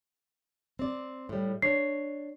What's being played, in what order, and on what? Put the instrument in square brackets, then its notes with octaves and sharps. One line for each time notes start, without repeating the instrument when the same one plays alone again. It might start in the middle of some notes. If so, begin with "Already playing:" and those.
[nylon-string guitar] C4 D5
A2 G3
[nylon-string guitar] D4 C#5 [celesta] C7